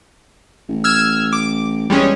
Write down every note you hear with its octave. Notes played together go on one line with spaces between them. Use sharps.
A1
E6 F6 G#6
D6
E1 G3 G#3 C#4